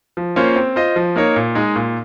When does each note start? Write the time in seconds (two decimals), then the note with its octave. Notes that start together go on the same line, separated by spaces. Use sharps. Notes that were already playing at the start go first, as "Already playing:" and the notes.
0.17 F3
0.36 A#3 C#4 F4 C5
0.56 C4
0.76 F4 C5 D#5
0.96 F3
1.16 A#3 D#4 A#4 C#5
1.36 A#2
1.55 G#3 D#4
1.76 A#2